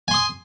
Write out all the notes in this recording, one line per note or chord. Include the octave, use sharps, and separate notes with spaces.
G#5 C6 D#6